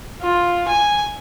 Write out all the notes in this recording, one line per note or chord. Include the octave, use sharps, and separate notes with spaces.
F4
G#5